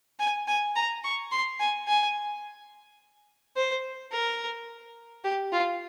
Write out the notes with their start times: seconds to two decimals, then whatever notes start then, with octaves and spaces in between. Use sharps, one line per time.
0.20 G#5
0.48 G#5
0.76 A#5
1.03 C#6
1.31 C6
1.60 G#5
1.88 G#5
3.56 C5
4.12 A#4
5.24 G4
5.53 F4